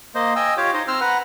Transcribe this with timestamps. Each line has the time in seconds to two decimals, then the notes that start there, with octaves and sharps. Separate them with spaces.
0.15 A#3 C5 D#5
0.36 D#5 G5 G#5 E6
0.57 F4 G4 C#5 D6
0.74 D#4 C5 D#5
0.88 C4 C5 E6 F6
1.01 B4 F#5 A#5